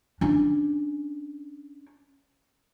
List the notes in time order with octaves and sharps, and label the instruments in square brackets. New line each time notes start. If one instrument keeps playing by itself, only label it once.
[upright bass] C#4 D4